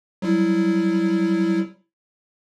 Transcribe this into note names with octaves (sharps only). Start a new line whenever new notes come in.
F#3 G3 E4